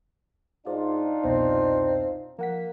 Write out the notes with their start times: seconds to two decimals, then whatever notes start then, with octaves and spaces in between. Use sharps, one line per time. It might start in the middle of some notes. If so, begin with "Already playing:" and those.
0.67 G#2 D4 D#4 F4 D5
1.24 C2 F2 B2 C4
2.39 F3 A#3 F#5 B6